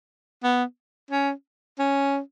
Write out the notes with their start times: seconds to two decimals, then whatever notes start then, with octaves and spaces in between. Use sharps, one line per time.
0.44 B3
1.11 C#4
1.79 C#4